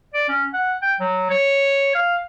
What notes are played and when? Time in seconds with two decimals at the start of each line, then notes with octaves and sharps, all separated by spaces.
0.14 D5
0.29 C#4
0.54 F#5
0.82 G5
1.00 F#3
1.30 C#5
1.95 F5